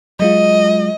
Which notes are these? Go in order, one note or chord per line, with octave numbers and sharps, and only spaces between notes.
F#3 G#3 F4 D#5